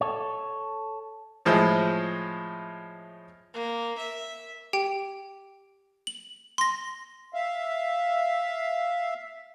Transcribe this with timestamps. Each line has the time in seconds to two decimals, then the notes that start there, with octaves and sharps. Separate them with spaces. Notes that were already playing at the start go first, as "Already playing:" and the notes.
0.01 A4 C#5
1.45 A2 F3 G#3 E4
3.54 A#3
3.98 E5
4.73 G4 G5
6.07 F#7
6.58 C6 A#6
7.34 E5 F5